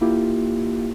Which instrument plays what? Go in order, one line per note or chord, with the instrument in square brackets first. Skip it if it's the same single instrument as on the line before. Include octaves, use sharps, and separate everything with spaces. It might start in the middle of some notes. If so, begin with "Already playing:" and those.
[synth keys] A#3 E4 F4 G4